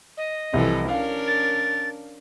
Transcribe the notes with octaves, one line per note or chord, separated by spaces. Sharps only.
D#5
C2 E3 F3 A4
C#4 D4 A#4 F5
A6